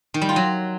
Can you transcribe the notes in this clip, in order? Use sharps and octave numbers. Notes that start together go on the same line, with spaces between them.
D#3
G3
F4
F#3